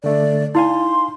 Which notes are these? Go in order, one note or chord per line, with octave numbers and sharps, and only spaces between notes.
D3 A3 D4 D5
D#4 E4 F5 G#5 C6